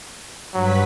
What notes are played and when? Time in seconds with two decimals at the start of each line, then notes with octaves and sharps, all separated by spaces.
0.54 G2 F#3 B4 B6